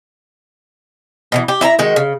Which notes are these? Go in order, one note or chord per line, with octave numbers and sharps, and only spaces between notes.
B2 D#3 E3
G4
E4 E5 G#5 A#5
D#3 G#3 F#4
C#3